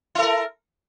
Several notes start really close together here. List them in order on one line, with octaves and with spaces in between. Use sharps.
E4 A4 A#4